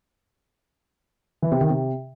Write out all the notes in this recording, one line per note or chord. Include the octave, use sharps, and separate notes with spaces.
E3
C3
D#3
C3